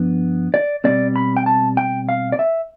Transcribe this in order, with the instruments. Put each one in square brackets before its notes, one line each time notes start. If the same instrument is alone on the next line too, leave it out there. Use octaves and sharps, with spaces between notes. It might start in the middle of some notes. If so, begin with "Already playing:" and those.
Already playing: [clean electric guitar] G2 F3 B3 D4
D5
B2 G3 C4 D5
B5
G5
A5
G5
F5
D5
E5